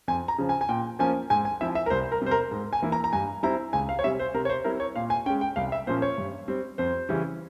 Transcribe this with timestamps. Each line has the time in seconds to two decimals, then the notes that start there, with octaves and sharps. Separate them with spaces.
0.08 F2 G#5
0.28 A#5
0.38 C#3 F3
0.49 G#5
0.61 G#5
0.69 A#2 G5
0.99 F3 A#3 C#4 G#5
1.30 G#2 G#5
1.45 G#5
1.61 F3 C4 E4 E5
1.75 E5
1.86 A#4
1.90 C2 C5
2.12 A#4
2.22 C3 G3 C5
2.31 A#4
2.51 G#2
2.73 G#5
2.82 E3 A#3 E4
2.92 A#5
3.04 A#5
3.13 G2 G#5
3.43 G3 C4 E4 A#5
3.73 C#2 G#5
3.89 F5
3.99 C#5
4.04 C3 G3 E5
4.19 C5
4.34 C3 A#4
4.45 C#5
4.49 C5
4.64 G3 C4 E4 A#4
4.80 C#5
4.96 A#2 F5
5.10 G#5
5.26 C#4 G5
5.30 G#3
5.41 G5
5.56 C2 F5
5.72 E5
5.87 A#2 F3 A#3 C#4 C5
6.02 C#5
6.18 G2
6.48 G3 C4
6.78 F2 C5
7.09 C#3 E3 G3 C#4